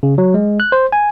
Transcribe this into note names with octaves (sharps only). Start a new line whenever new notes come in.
C#3
F#3
G#3
F#6
C5
G#5